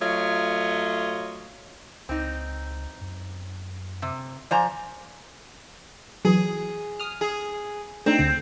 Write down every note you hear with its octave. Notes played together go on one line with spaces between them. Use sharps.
F#3 A3 F4 C#5 D#5
C#2 C4 D#4
F#2
C3
F3 C5 D5 G#5 A#5 D6
E3 F#3 G#4
D#6 F6
G#4
A3 C4 D4 D#4
D2 D3